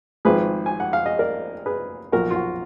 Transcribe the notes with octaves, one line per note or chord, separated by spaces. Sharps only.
G#1 G#2 F3 G#4 B4
G#5
F#5
F5
D#5
A#4 D5
G#4 B4
B1 A#2 F3 F#4 A#4
F4
F#4